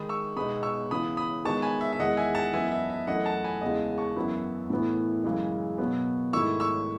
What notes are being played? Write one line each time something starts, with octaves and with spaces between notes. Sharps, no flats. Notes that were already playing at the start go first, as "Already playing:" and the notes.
Already playing: D#3 G#3 D#4 B5 D#6
C#6 E6
B2 G#3 B3 D#4 B5 D#6
C#6 E6
C#3 E3 B3 B5 D#6
B5 D#6
D#3 G#3 B3 D#4 A5 C#6
G#5 B5
E5
E5
E2 D#3 G#3 D#5 F#5
E5 G#5
F#5 A5
F#2 E3 B3 E4 E5 G#5
E5
E5
F#2 E3 A3 E4 D#5 F#5
F#5 A5
G#5 B5
E2 C#3 G#3 D#5
A5 C#6
F#2 E3 B3 E4
A2 E3 B3 E4
F#2 C#3 E3 G#3
B2 F#3 B3
G#2 D#3 A3 E4 C#6 E6
C#6 E6